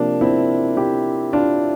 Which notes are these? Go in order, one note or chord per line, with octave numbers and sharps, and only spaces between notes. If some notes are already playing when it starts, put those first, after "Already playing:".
Already playing: C3 F3 A#3 D4
C4 E4
E4 G4
D4 F4